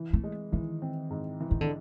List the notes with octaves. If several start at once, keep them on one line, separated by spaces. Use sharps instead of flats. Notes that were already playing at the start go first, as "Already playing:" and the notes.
Already playing: E3
A3
G#3
D#3 E3
C4
G#2
E3
D#3
D3